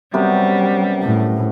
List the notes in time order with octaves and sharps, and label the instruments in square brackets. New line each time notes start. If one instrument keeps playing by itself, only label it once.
[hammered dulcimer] F#2 C3 B3 [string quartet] G3
[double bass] A2